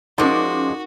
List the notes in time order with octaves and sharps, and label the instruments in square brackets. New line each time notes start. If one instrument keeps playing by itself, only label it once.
[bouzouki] F3 G#3 [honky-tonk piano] C#4 D6 [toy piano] D#4 A#4 D5 [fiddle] F#4